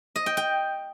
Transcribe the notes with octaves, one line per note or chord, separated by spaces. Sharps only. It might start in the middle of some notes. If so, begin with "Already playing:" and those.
D#5
G5
G5